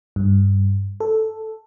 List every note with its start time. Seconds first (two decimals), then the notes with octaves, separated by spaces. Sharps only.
0.16 G2
1.00 A4